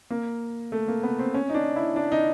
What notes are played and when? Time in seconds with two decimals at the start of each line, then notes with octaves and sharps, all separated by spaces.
0.10 A#3
0.72 A3
0.88 A#3
1.03 B3
1.19 C4
1.34 C#4
1.49 D#4
1.54 D4
1.76 E4
1.96 D4
2.12 D#4